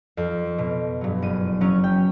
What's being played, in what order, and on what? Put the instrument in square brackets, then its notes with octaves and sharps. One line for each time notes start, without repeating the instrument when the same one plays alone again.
[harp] F2
B2
G2 F#3
F#1 D#7
F#3 C#4
G5